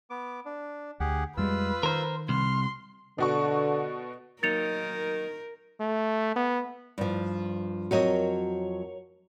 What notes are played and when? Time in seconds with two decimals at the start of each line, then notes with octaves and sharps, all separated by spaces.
0.10 B3 D6
0.45 D4
1.00 D2 G4 G#4 F#5
1.37 F2 G3 G#3 F4 B4 E6
1.83 D#3 A#4 C5
2.29 C2 C6 F6
3.18 B2 D3 F#4 C#6
4.43 D#3 F#3 A#3 D#4 A#4 A6 C#7 F7
5.80 A3
6.36 B3
6.98 G2 F3
7.91 F2 F#3 F#4 A#4 C#5 D#5